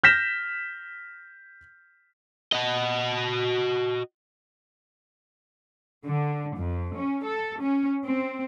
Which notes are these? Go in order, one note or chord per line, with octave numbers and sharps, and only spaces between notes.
F6 G6 A#6 B6 E7
F#4 D#5
D3
F2
C#4
A4
C#4
C4